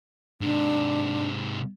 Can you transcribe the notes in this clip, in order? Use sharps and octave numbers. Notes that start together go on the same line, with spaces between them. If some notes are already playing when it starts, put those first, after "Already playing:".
G#2 C3 D4